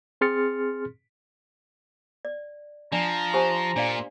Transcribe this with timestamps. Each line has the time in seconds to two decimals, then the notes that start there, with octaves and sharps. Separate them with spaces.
0.21 C4 G#4 C6 F6 A6 C#7
2.25 D5
2.92 F3 D4 D5 A#5
3.34 G4 C5 G#5
3.76 A#2 D4 D5 F5